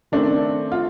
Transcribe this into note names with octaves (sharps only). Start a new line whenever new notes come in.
D#3 A3 C4 D4
F4